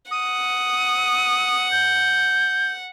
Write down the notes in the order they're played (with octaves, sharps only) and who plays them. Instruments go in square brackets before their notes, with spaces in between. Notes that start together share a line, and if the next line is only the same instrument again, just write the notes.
[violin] F#5 [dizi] D#6
[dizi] G6